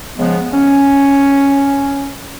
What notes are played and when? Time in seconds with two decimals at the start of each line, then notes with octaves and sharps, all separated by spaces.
0.18 C#3 F3 G#3 B3
0.54 C#4